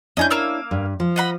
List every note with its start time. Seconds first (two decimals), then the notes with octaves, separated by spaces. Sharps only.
0.17 C#4 D4 E4 D#5 G#5 G6
0.30 A#3 F5 E6
0.71 G2
1.00 F3
1.16 D#5 F#5 B5